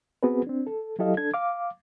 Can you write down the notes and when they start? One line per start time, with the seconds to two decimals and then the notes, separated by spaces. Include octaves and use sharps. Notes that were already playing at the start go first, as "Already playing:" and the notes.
0.23 B3 C4 F#4 G#4 B4
0.47 C4 D4
0.67 A4
0.99 F#3 E4 G4 A4 D#5 F5
1.17 D4 A4 G#6
1.34 F5 D6